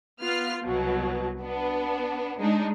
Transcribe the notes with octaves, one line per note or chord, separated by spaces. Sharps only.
B3 F4 B4 F6 C7
C2 B2 F#3
B3 D4
G#3 D4 D#4